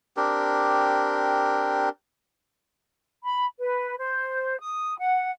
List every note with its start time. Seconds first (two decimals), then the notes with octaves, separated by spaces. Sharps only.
0.17 C4 D4 G4 A#4
3.24 B5
3.59 B4
3.98 C5
4.59 D#6
4.99 F#5